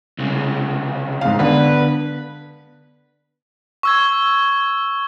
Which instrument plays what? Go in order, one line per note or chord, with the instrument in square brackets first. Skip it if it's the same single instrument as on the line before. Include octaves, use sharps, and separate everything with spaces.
[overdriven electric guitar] C2 C#3
[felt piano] G#2 F5
[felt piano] D3 B3 [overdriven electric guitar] B4
[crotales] C#6 E6 G#6